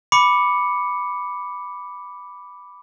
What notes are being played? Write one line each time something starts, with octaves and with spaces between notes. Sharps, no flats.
B5 D6 C#7